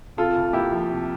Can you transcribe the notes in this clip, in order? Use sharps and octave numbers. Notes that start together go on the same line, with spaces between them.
C3 F4 A4
D2
A#3 E4 G4
F3
C3